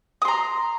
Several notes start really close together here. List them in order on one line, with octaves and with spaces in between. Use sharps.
D#6 C6 A#5